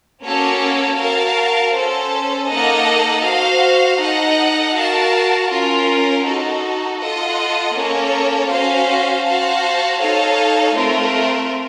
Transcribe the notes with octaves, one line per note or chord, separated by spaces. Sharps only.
A#3 C#4 F#4 A4 C#5
F#4 A#4 F5 A5
C#4 A4 C5
A#3 D#4 A4 D#5 F#5
F#4 C5 F5
D#4 A4 D#5 F#5
F#4 A#4 F5 A5
C#4 F4 A#4
D#4 F#4 A4
F4 A4 D#5 F#5
A#3 C#4 A4 C#5
C#4 F#4 C5 F5
F#4 C5 F5 A5
D#4 A4 C#5 F5
A3 C4 F4 A#4